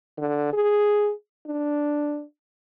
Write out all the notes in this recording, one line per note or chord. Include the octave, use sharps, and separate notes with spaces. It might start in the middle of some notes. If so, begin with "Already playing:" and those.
D3
G#4
D4